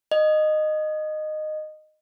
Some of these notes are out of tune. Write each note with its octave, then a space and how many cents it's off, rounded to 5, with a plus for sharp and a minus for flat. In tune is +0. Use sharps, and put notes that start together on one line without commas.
D#5 -15